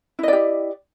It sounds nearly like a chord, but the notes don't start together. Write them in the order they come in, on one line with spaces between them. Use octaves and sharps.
E4 D#5 D5 G4